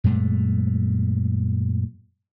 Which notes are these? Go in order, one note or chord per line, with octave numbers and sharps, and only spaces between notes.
F#2 A#2 G#3 A3